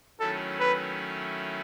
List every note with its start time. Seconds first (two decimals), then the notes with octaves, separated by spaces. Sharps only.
0.20 D#3 F#3 A3 C#4 E4 A4
0.60 B4